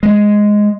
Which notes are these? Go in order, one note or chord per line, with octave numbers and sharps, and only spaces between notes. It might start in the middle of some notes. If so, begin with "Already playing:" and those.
G#3